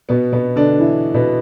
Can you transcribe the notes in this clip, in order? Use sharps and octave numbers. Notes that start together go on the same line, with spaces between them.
B2 B3
B2 B3
D3 D4
E3 E4
B2 B3